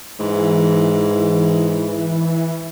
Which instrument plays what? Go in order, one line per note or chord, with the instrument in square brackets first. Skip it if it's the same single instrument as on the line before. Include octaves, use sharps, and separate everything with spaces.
[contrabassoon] G#2 [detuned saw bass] E3